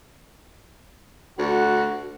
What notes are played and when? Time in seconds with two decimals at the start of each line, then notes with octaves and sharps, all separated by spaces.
1.39 D2 F#4